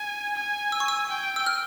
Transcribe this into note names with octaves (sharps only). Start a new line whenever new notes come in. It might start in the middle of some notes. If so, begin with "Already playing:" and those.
Already playing: G#5
G#5
E6
C#6
E6
G5
E6
F6